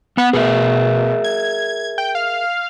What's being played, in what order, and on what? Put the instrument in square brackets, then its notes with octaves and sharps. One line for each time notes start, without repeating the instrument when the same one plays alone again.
[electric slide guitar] B3 F#5
[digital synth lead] B2 [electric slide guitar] G#4 A#4 E5
[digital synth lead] G#6
G5
F5